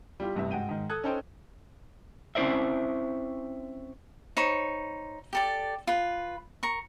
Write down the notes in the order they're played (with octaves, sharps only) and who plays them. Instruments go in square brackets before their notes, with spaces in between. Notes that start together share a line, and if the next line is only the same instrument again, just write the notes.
[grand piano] G3 E4 F4 G4
A1 G2 C3 E5
G#2 F#4 G5 D#7
G#2 D#3
A4 D#6 F#6 G#6
C#4 D#4 A4 C5 G5
[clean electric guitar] C4 C#4 E4 C5 D5 E5
[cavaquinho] D#4 C5 C#5 B5
G4 A4 D5
F4 B4
A#4 C#6